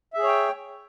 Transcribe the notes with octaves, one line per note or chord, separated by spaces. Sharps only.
G#4 C#5 E5 G5